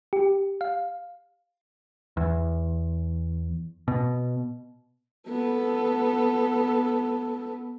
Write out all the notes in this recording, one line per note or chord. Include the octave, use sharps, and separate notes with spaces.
G4
F5
E2
B2
B3 A4